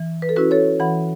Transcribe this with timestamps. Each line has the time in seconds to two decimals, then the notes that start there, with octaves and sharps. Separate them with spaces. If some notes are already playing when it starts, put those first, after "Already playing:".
Already playing: E3
0.22 B4
0.29 A4
0.36 C#4 E4 F#4 B4
0.51 A4 C#5
0.80 E3 F#5 B5